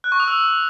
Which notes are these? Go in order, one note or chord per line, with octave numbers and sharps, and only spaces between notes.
F#6
C#6
D#6
E6